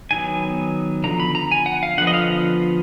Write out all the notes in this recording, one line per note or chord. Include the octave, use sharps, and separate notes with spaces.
D#3 F#3 B3 G#5
D3 F3 B3 A#5
B5
A#5
G#5
F#5
F5
D3 F3 B3 F#5
D#5
F5